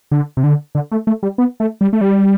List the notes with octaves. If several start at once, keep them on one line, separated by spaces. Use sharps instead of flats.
D3
C3
D3
D3
A3
A3
G3
B3
A3
G3
A3
G3